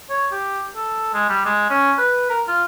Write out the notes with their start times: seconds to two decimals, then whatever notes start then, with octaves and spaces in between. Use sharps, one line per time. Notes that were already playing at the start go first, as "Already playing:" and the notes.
0.10 C#5
0.32 G4
0.76 A4
1.13 G#3
1.29 G3
1.45 G#3
1.70 C#4
1.98 B4
2.30 A#4
2.48 F4